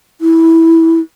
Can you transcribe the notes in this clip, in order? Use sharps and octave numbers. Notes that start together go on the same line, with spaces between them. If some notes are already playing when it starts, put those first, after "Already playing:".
E4